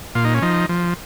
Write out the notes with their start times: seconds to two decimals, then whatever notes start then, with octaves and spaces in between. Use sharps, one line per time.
0.15 A#2 F4
0.25 D#4
0.34 C#4
0.42 F3 D#4
0.69 F3